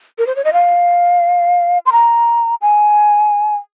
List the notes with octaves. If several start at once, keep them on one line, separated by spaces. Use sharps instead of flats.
A#4
C5
C#5
D#5
F5
C6
A#5
G#5